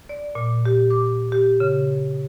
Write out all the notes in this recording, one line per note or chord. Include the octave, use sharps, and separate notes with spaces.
D5
A#2
G4
D6
G4
C#3